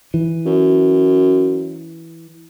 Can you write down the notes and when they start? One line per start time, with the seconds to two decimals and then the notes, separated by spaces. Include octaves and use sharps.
0.14 E3
0.46 F#2